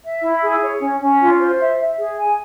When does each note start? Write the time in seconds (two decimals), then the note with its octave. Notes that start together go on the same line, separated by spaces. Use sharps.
0.03 E5
0.23 E4
0.42 G#4
0.62 C#5
0.81 C#4
1.00 C#4
1.20 F4
1.39 C5
1.59 E5
1.79 E5
1.98 G#4
2.17 G#5